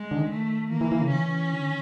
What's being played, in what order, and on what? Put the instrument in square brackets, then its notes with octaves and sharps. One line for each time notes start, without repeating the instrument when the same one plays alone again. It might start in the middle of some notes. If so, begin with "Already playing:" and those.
Already playing: [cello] G#3
[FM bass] D3
D#3
[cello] A3
[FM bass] E3 [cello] A#3
[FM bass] E3
E3
C#3
[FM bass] E3 [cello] C#4
[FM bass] D3
D#3